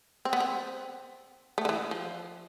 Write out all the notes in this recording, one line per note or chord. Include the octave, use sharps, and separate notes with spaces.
C4
B3
C4
A3
D3
E3
F3